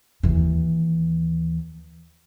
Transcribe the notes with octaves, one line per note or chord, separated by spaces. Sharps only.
D#2 E3